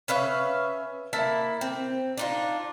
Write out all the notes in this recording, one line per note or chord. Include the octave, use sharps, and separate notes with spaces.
C#4 B4 E5 F5
A#3 E4 E5 A5
C4
D4 D#4 F4